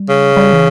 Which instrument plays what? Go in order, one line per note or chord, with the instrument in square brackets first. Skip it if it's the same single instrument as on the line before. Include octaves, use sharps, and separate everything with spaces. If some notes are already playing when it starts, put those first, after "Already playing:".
Already playing: [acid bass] G3
[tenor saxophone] C#3
[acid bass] G3
E3